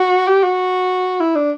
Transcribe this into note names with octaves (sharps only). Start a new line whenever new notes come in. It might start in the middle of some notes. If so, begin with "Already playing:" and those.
Already playing: F#4
G4
F#4
E4
D4